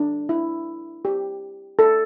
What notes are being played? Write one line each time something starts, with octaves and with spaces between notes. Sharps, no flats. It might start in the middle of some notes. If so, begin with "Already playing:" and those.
Already playing: D4
E4
G4
A4